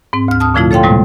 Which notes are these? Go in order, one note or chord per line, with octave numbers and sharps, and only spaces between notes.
G#2 C4
D2 F6
A5 D#6 F6
A#2 D3 F3 A3 E4 F4
A4 C#5 F5 G5 C6
A2 C3 G3 G#3 A#3